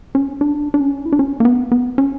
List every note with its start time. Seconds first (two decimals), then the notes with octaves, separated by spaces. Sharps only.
0.15 C#4
0.41 D4
0.74 D4
0.80 C#4
1.06 E4
1.13 D4
1.19 C#4
1.40 A#3
1.45 B3
1.72 B3
1.98 C#4